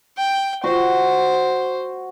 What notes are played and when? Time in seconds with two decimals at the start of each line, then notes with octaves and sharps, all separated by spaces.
0.18 G5
0.64 F#4 C5